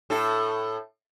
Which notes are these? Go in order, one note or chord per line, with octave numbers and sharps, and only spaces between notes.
A2 A4